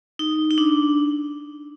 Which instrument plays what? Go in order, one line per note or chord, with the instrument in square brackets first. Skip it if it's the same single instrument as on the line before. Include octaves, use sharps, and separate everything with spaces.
[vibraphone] D#4
D#4
D4